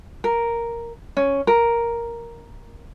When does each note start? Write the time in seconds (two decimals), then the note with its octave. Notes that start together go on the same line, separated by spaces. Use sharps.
0.24 A#4
1.17 C#4
1.47 A#4